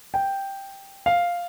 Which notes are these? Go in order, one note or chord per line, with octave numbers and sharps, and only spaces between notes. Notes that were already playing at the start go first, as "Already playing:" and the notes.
G5
F5